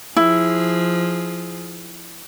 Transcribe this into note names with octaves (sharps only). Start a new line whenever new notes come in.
F3 E4 G#4